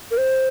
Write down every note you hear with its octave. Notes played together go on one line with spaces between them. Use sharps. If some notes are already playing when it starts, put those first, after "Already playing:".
A#4
C5